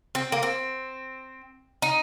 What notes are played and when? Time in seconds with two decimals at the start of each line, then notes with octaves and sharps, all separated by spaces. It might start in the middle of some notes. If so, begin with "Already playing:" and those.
0.15 C4
0.32 A#3
0.43 C4
1.82 D#4